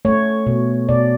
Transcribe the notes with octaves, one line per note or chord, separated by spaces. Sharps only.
A3 C#5
B2
B2 D5